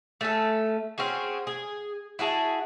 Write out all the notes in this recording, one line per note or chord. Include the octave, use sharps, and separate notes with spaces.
A3 C#4 A4
C4 C#4 F#4 G#4
G#4
E4 F#4 G#4 A5